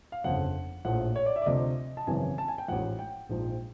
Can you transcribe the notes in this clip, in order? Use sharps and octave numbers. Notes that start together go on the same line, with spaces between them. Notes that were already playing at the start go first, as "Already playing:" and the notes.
F5
G1 F2 C#3 F3 F#5
A#1 A2 F3 F#5
C#5
D5
E5
D5
D2 C3 F3 D#5
A5
G#1 F#2 C#3 E3 G#5
A5
G#5
G5
A1 G#2 F3 F#5
G5
A#1 G#2 F3